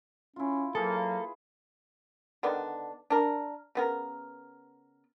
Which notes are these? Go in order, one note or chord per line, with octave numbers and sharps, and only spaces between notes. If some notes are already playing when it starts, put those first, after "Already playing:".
C#4 E4 F4
F#3 A#3 G#4 A4 B4
D3 D#3 B3 D4
D4 A#4
C#3 B3 A#4